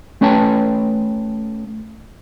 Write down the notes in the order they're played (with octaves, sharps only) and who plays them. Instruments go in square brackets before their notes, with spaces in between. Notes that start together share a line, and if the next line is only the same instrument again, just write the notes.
[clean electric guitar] A3 C#4 B4 C#5 G5 A5